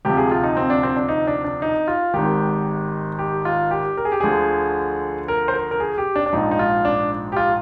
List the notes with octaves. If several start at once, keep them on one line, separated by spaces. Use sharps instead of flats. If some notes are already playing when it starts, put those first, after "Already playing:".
D2 C3 F3 G4
G#4
F4
D#4
C4
D4
C4
D4
D#4
D4
D4
D#4
F4
G#1 G#2 D#3 G4
G4
F4
G4
A#4
G#4
G4
D2 D3 F3 G#4
A#4
C5
A#4
A#4
G#4
G4
D4
D4
A#1 G#2 F3 D#4
D#4
F4
D4
G4
F4